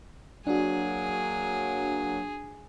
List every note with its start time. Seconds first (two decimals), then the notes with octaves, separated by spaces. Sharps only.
0.47 F#3 A#3 D4 F#4 G#4